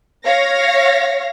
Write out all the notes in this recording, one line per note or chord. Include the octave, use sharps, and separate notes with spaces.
C#5 F5 A#6